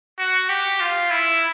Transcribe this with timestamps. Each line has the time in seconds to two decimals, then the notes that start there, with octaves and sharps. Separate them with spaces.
0.18 F#4
0.49 G4
0.80 F4
1.11 E4